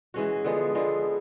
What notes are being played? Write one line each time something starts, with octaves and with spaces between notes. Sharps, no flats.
E3 G#3 C#4 F#4
D3 F3 G#3 B3
D3 F3 G#3 B3